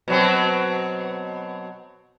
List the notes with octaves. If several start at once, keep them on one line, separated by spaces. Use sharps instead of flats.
B2 F#3 C4